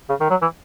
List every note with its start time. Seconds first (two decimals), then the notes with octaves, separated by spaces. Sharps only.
0.09 C#3
0.20 D#3
0.30 F#3
0.42 E3